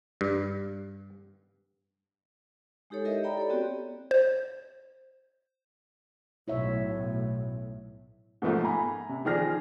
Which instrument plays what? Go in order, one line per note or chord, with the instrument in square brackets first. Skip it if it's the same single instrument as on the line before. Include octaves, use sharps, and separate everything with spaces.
[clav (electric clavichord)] G2
[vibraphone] G#3 D#4 G4 A4 C#5
E4 G4 A#4 D#5 E5
D5 G5 A#5 B5
A4 C#5 D5
B3 C4 F#4 G4
[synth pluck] C5
[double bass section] B1 A2 [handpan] E4 C#5 E5
[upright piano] G#2 B2 F3 A3 A#3
G#5 A#5 B5
C3
D#3 F3 G#4 D5 F6 A#6